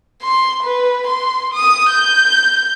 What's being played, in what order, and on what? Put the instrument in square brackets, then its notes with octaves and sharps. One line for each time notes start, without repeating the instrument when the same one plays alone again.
[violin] C6
B4
C6
D#6
G6